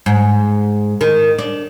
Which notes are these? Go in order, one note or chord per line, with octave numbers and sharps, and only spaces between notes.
G#2
D#3
D4